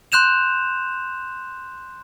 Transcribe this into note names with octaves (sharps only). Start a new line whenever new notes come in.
C6 F#6 G6 E7 F7